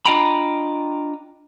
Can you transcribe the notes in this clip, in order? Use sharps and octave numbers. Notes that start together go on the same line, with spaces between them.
D4 F4 D#5 G5 A#5 B5